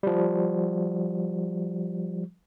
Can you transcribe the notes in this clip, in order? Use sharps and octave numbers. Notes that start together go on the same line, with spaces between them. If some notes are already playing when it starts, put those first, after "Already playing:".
F3 G3